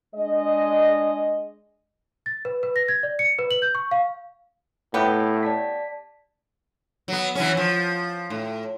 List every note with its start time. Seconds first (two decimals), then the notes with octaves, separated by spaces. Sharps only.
0.15 G#3 D4 D#5
2.26 A6
2.45 B4
2.63 B4
2.76 A#6
2.88 G#6
3.03 D5
3.19 C#7
3.39 B4
3.51 F#7
3.62 G6
3.75 C#6
3.91 F5
4.94 A2 B3 G4
5.43 D5 A5 B6
7.08 F#3 B3
7.35 E3 F#3 C#4
7.57 F3
8.30 A2